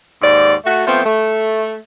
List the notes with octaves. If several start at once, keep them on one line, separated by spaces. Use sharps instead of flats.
D#2 G#2 D5
A3 F#4
F3 A3 B3 C4
A3